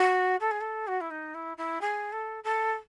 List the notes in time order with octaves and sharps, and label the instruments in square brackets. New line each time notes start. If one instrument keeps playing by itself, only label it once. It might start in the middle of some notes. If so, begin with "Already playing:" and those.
Already playing: [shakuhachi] F#4
A4
G#4
A4
F#4
E4
D#4
E4
E4
G#4
A4
A4